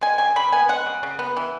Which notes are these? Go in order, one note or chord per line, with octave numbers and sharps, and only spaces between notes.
G#3 G#5
C#3 G#5
C#3 B5
B3 G#5
G#3 F#5
C#3
C#3
B3
E3